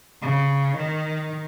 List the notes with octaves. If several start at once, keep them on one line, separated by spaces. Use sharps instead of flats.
C#3
D#3